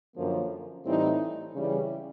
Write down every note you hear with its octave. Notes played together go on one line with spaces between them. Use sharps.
F#2 D3 F3 A#3
A2 E3 G3 C4 D#4
C#3 E3 G3